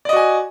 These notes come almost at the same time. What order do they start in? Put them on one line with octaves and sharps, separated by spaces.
D5 D#5 F#4 G#5